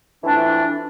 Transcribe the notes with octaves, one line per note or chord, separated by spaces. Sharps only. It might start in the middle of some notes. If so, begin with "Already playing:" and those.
F2 E3 A3 D4